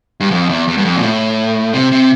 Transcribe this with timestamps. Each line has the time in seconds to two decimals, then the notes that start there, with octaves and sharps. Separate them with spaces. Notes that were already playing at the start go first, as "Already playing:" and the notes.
0.20 G2
0.31 F2
0.49 E2
0.68 E2
0.78 G2
0.85 F2
0.96 A#2
1.03 A2
1.73 C3
1.92 C3